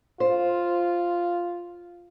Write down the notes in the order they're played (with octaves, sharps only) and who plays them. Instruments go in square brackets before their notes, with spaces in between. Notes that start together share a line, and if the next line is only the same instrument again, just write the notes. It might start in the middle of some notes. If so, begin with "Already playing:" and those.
[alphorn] F4 [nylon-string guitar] C5